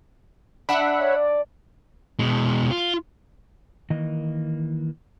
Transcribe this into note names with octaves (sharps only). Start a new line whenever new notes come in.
D4 E5 F#5 B5
C#5
D5
B2 G#3
F4
D#3 E3 A#3 D#5